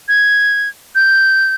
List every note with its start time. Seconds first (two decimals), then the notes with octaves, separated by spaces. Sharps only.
0.08 G#6
0.95 G6